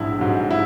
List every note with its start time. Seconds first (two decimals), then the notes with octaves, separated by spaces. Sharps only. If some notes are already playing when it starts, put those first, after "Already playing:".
Already playing: A#1 G#2 F#3 E4
0.19 G#2 F#3
0.51 E4